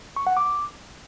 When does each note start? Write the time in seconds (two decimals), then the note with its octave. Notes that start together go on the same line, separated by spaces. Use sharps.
0.16 C#6
0.27 F#5
0.37 D6